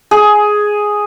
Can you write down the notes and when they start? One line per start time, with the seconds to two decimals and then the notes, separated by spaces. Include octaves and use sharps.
0.11 G#4